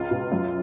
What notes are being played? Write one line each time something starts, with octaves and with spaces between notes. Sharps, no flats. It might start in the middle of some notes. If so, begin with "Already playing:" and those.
Already playing: C#2 F4
B2
F#2